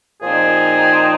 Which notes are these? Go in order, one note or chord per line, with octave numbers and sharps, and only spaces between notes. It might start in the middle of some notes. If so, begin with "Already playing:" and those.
A#2 F3 C4 D#4 G#4